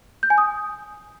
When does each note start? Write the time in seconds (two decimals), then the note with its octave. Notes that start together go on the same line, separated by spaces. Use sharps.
0.23 G6
0.30 G#5
0.38 D#6